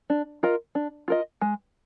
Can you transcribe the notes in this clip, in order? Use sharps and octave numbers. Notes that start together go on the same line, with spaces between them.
D4
F4 A#4 D#5
D4
F4 A#4 D#5
G#3